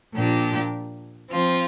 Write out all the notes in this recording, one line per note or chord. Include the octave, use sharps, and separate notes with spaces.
A#2 F3 D4 G4
F3 C4 F4